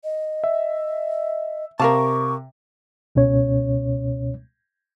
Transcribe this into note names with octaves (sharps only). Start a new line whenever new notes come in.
D#5
E5
C3 A#4 F5 A5 C#6 D6
C#2 B2 C#4 C#5